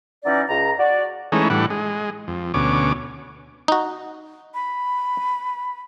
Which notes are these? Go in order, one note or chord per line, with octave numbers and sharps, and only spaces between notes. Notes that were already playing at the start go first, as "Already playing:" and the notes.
E3 F#3 C#4 D#4 D5
C#2 A#5
F#4 D5
E3 G#3 A3 C#4 D#4
A2 E3 G3 D4 F#5
G#3
F2
D2 B2 C#4 D6
D#4 F#4
B5